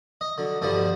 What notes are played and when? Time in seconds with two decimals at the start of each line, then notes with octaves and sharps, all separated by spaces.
0.21 D#5
0.38 D3 F#3
0.62 G2 B2 D3 F3 G3 B3